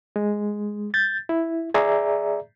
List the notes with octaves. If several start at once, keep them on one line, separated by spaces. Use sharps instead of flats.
G#3
G6 A6
E4
G#4 D5 E5 A#5